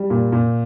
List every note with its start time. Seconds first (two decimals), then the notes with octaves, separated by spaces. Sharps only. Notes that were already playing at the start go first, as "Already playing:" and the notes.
Already playing: G3
0.10 A#2
0.32 A#2